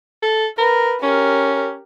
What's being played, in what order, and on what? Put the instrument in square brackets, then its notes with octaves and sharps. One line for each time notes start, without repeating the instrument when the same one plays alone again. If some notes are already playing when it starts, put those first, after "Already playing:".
[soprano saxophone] A4
[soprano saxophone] A#4 [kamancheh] B4
[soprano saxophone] C#4 [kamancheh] G4 A#4